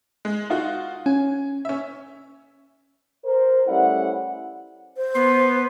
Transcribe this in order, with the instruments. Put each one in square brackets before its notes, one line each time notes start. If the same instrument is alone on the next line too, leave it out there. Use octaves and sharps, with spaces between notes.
[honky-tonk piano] G#3
D#4 F4 F#4
[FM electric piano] C#4 [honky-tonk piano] G#5
[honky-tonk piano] C#4 E5
[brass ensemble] A#4 C5
G3 A3 C#4 E4 D5 F#5
[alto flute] C5
[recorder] B3 [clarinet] C6